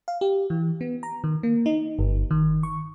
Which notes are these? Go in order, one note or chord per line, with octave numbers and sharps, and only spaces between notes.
F5
G4
E3
B3
A#5
D#3
A#3
D#4
G1
D#3
C#6